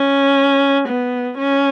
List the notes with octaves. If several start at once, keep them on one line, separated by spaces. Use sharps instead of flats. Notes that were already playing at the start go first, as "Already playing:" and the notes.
Already playing: C#4
B3
C#4